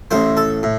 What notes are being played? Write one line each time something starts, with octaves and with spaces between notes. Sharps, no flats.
A1 A2 A3 C5
A4
A2